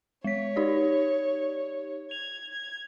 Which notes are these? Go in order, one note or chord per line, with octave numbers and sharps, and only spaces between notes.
G#3 C#5 B6
D#4 G4 D5
G#6 F7
G#6